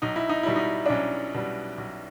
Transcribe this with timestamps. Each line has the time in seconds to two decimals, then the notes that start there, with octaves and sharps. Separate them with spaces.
0.02 B1 D#4
0.16 E4
0.29 D#4
0.43 B2 G3 E4
0.56 D#4
0.86 D4
0.90 B1 C#4
1.35 B2 G3
1.78 B1